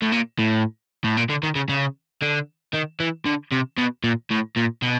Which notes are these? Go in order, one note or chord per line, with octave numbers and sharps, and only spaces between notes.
A2
A#2
A2
A2
A#2
D3
D#3
C#3
C#3
D3
D#3
E3
D3
C3
B2
A#2
A2
A#2
B2